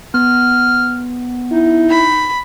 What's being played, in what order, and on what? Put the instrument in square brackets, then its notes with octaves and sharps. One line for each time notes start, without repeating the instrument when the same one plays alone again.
[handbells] B3 [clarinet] F6
[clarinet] D#4 [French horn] E4
[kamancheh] B5